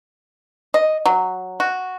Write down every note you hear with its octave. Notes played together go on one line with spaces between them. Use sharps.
D#5
F#3
F#4